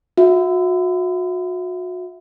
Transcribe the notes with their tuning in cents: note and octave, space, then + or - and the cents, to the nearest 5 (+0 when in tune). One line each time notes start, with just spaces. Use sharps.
F#4 -35 E5 +0